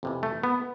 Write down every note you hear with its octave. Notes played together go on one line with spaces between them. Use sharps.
F2 C3 E3
A3
B3